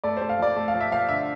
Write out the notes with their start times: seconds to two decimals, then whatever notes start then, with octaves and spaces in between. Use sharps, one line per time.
0.04 A3 D5
0.17 C5
0.21 A3
0.29 F5
0.39 F3 D5
0.56 A3
0.68 F5
0.74 F3
0.80 E5
0.91 F3 F5
1.09 D3 E5